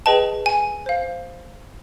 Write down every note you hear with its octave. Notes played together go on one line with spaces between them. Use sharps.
G#4 B4 D#5 G5 A5
G#5
C5 F5